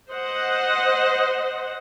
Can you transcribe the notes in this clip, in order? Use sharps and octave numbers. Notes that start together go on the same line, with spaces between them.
C5 D#5 F#5